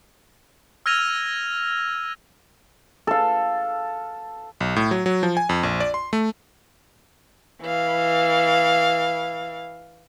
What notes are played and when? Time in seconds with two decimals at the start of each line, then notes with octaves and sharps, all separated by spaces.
0.86 E6 F6 G#6 A#6 D#7 F7
3.07 A4 F5
4.60 B1
4.76 A2
4.91 F#3
5.06 F#3
5.23 F3
5.37 G#5
5.49 F2
5.63 A#1
5.80 D5
5.94 C6
6.13 A3
7.62 E3 F5